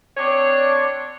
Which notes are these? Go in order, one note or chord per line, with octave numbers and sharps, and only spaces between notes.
C4 D4 C#5